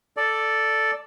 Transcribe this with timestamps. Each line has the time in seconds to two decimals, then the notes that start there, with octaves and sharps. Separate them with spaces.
0.17 A4 D5